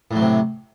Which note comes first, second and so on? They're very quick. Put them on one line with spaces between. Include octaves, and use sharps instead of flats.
A2 F#3 C3